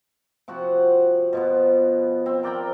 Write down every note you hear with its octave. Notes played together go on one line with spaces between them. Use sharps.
C3 F3 F#4 F#5
B2 F3 B3
C4
A#4 D5 G5 A#5